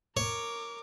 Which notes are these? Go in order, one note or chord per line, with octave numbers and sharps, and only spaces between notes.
A#4 C#5 D6